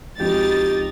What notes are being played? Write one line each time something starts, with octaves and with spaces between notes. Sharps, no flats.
C#2 F3 C4 D#4 F#4 G4 A6